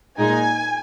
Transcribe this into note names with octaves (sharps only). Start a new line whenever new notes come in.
A#2 G#3 D#4 G#5